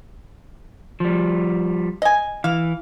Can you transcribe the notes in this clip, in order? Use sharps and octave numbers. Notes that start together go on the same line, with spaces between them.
F3 G3
D#5 G#5
E3 F5